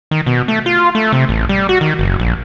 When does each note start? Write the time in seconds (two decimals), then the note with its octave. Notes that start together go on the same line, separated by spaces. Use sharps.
0.11 D#3
0.26 B2
0.48 A3
0.66 F4
0.95 A3
1.12 C3
1.29 A1
1.49 G3
1.69 F#4
1.81 D#3
1.99 F#1
2.20 A#1